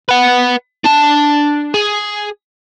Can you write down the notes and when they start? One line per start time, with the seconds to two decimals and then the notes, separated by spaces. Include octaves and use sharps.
0.09 B4 F#5
0.84 D4 A5
1.74 G#4